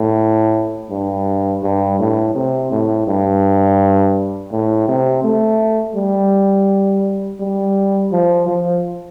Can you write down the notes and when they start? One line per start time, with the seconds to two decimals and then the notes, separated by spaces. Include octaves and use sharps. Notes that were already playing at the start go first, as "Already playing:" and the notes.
Already playing: A2
0.90 G2
1.63 G2
1.99 A2
2.35 C3
2.71 A2
3.07 G2
4.52 A2
4.88 C3
5.24 A3
5.95 G3
7.40 G3
8.12 F3
8.48 F3